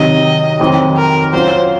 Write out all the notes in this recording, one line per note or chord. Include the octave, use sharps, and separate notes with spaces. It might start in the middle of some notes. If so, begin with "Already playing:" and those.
Already playing: C3 D#3 F#3 D#5
F2 D#3 F#3 C4
A#4
F#3 C#4 F4 C5